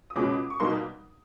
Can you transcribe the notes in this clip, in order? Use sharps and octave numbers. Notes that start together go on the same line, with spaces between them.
D#6
C#2 B2 G#3 C#4 D6
C#6
B2 G3 A#3 D#4 C6